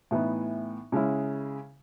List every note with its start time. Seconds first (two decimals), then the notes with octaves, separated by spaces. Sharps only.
0.11 A2 E3 B3 D#4
0.92 C#3 G#3 C#4 E4